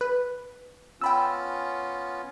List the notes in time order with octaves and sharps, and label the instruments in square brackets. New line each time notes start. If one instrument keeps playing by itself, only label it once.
[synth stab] B4
[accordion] B3 C#4 F4 [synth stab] G5 B5 E6